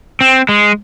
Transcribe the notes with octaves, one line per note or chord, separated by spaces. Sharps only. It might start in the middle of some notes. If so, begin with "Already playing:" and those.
C4
G#3